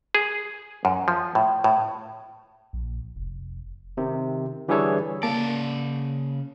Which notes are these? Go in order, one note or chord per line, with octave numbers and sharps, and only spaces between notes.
G#4
F#2
F3
A2
A2
A#1
F1
C3 D#3
D3 E3 G3 G#4 A4 C#5
C#3 A#3 D5 A5